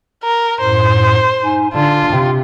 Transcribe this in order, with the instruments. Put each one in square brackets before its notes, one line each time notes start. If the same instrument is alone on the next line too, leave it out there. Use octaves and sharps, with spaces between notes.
[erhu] A#4
[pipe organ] F#2 A2 [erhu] C5
[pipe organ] D#4 G#5
[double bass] D3 [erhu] F4 [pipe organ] A5
[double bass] C3 [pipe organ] G5